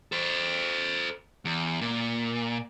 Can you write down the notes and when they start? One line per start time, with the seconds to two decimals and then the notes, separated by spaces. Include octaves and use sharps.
0.12 A4 C5
1.45 E2
1.81 A#2